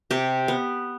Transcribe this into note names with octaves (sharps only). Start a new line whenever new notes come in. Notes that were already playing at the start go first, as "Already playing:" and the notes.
C3 G4
B3